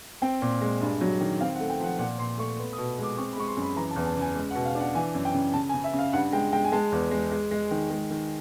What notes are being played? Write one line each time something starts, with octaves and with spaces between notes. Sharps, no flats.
C4 G5
A#2
G#3
G2
F#3
D#3
C4 F5
F#5
A3
G5
F3 F#5
A#2 F#5
A#2 C6
A3 C#6
B3
D#6
B2
G#3 D6
C4 C#6
B5
G#3 C#6
C6
F#2
B5
E3 A#5
A5
E2
A5
C#3 G#5
G#3
F#5
B2
F5
D4
F#5
E3 G#5
F#2
G5
C#3
C#3 A5
G#5
C#3
E5
C#3
F5
G2 F#5
G#3 G5
G#3 G5
G#5
G#3 A5
E2
G#3
G#3
G#3
D#3
G#3
D#3